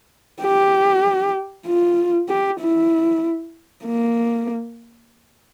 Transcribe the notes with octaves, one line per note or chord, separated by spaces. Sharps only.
G4
F4
G4
E4
A#3